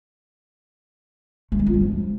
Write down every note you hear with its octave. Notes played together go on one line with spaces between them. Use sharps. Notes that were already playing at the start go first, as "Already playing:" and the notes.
A3
G#3
F4
G#3
F3